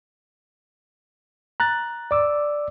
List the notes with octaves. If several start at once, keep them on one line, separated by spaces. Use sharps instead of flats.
A#5 F#6 A6
D5 D6 E6